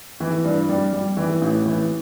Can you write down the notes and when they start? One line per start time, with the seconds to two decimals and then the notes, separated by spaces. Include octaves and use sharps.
0.20 E3
0.44 G2
0.69 G3
0.93 G3
1.17 E3
1.42 A1
1.66 E3